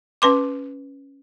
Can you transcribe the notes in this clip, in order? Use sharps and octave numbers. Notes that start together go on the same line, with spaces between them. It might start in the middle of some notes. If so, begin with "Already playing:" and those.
C#4 B4 C6 D6